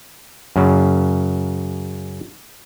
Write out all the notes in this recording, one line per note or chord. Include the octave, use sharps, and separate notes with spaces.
F#2 C#3